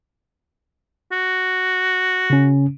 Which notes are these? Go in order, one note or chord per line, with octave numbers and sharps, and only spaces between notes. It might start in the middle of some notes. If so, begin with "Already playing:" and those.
F#4
C#3 C#4